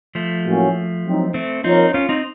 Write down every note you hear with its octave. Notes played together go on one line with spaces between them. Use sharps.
F3 A3
A2 F#3 A#3 C#4 F#4
F#3 C4 D#4
A3 C4
F3 A#3 C4 D#4 F4 A#4 C#5
C#4 F4
C4 D#4